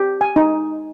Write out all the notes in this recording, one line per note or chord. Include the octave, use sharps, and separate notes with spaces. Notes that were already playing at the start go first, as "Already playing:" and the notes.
Already playing: G4
G#5
D#4